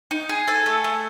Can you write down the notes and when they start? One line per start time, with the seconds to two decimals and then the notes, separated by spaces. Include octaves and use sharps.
0.11 D#4
0.29 G#4
0.48 A4 G#5
0.66 A3
0.84 A3